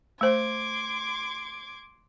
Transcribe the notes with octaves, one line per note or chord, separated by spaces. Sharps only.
A3 C5 C6 D6 G#6